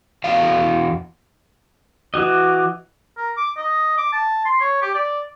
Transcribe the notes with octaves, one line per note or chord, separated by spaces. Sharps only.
E2 F#4 F5
E3 F#4 D#5 D6
A#4
D6
D#5
D6
A5
C6
C#5
G4
D5